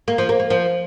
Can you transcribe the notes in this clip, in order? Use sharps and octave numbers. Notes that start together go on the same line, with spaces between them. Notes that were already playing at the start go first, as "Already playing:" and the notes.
A#3
F3
A#3
A#3
F3